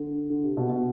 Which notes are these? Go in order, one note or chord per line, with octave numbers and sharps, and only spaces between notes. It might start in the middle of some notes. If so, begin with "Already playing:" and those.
Already playing: D3
D3
C3
B2
B2